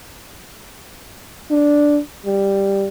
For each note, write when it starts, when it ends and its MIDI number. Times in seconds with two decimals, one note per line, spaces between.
1.51 2.00 62
2.26 2.88 55